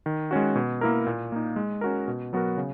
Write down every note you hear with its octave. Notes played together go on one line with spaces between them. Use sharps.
D#3
G#3 C#4 F#4
B2
A#3 E4 A#4
A#2
A#3 D#4
G#3
C#4 F#4 A#4
B2
F#3 B3 F#4 A#4
C#3